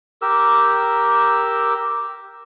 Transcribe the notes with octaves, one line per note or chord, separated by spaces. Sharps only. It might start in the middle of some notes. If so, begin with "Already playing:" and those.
G4 A#4 E6